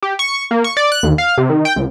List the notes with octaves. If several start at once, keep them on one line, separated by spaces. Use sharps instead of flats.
G4
C#6
A#3
C#6
D5
F#6
D#2
F5
C3
D#3
G5
C#2